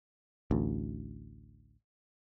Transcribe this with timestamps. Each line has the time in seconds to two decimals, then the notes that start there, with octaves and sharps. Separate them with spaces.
0.51 A1 D2